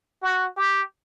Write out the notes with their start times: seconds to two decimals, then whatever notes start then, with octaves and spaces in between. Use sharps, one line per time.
0.22 F#4
0.57 G4